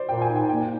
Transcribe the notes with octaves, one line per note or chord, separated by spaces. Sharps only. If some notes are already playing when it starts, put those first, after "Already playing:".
Already playing: C5 D5
A#2 G5
G#5
D#4
G5
A#3 G5